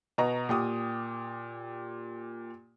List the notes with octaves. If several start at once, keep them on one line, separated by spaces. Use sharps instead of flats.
B2 D#5 A#5
A#2 G4 D#6